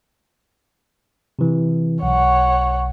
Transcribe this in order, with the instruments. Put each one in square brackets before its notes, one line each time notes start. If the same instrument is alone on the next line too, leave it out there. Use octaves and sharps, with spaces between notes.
[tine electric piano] C3 E3
[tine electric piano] B1 [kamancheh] C#5 F#5